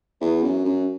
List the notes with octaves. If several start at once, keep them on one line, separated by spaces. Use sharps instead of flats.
E2
F#2
F#2